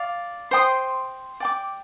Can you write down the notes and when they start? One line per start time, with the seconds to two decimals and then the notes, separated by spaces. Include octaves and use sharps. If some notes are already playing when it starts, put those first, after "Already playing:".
Already playing: D5 F5
0.51 C5 G5 C6 D#6
1.40 D5 G5 D6